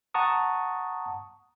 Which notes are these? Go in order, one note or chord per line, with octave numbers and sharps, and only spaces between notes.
F#5 A5 A#5 C#6 D#6